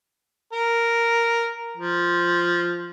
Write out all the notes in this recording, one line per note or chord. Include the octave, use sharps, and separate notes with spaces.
A#4
F3